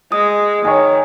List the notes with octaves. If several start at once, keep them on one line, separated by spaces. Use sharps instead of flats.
G#3 D#6
D#3 C#5 G#5